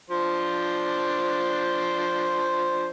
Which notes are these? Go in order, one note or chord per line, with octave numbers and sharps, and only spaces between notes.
F3 D4 C5